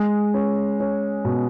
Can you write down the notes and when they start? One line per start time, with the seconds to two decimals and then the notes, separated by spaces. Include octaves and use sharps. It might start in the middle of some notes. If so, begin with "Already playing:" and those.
Already playing: G#3
0.34 C#4
0.80 C#4
1.25 B2